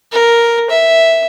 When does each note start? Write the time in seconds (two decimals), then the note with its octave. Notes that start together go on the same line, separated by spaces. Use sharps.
0.12 A#4
0.70 E5